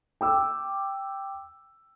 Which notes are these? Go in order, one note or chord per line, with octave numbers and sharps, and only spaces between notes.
G5 D6 E6